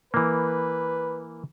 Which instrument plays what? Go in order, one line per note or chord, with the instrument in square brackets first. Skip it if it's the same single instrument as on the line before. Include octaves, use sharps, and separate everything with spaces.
[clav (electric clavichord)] E3 A#3 [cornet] B4